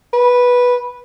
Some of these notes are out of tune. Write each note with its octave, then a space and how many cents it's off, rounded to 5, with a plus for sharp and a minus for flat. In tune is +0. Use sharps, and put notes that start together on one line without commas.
B4 -10